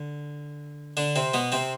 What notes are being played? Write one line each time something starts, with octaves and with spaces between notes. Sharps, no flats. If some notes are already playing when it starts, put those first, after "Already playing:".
Already playing: D3
D3 D4
C3 C4
B2 B3
C3 C4